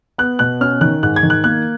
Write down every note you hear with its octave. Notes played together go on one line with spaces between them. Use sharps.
B3 F#6
B2 F#6
C#4 F6
D#3 F#6
G#2 F#6
G#6
D#3
F#6
A#3 F#6